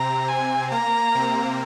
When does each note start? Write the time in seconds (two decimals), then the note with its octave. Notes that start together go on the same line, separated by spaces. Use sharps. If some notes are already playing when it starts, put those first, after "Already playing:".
Already playing: C3 C4 A#5
0.28 G#5
0.71 A#3 A#5
1.15 C3 C4